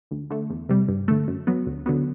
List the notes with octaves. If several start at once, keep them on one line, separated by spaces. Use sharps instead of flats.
D2
D3 A3
E2
C3 G3
G2
D3 A3
F#2
F#3 B3
D2
D3 F#3 B3